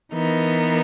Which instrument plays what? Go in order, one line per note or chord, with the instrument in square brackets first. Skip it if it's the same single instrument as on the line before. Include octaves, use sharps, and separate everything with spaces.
[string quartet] E3 B3 D#4 A#4